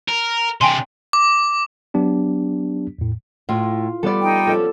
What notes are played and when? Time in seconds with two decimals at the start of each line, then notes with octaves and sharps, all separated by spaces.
0.08 A#4
0.61 C3 D4 G5 G#5 C6
1.13 D6
1.94 F#3 B3 D4 G4
2.99 E2 A2
3.49 A2 F4
4.03 G3 B3 A4 D5
4.21 D#4 G5
4.47 F3 C#4 A4